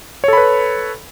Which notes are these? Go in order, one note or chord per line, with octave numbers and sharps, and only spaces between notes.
A4 B4 C#5 B5